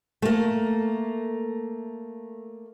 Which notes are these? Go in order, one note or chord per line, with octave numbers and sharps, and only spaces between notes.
A3 A#3